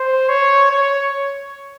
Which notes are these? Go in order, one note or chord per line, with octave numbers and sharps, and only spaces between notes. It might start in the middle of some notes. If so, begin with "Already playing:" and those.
Already playing: C5
C#5
C#5